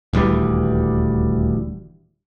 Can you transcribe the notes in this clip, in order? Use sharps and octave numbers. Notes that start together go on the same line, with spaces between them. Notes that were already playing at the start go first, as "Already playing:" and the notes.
D#1 D2 E3 G3